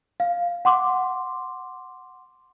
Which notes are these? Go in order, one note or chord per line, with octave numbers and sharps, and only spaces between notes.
F5
F#5 C6 D6